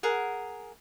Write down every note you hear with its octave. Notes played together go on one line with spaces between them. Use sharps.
G#4 A#4 F#5